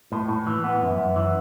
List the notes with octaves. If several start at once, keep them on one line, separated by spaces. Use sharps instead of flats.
A2
A2
E3
B3
F#2
F#2
E3